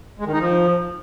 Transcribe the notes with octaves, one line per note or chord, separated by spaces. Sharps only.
G#3
D#3
D#4
F3